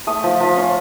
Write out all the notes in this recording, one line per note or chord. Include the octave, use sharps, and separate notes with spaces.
A3 D#6
F3
F3
C#4